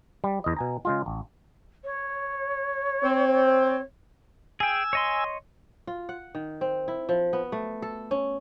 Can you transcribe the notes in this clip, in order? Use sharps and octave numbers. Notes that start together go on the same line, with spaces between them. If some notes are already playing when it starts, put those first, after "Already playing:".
G3
E2 D#5
B2 G#5 A#5
C#3 G#3 F4
A1
C#5
C4
G#4 G5 G#5 E6
C#5 D#5 C6
F4
F#5
D#3
C4
E4
F3
B3
A3
A4
C#4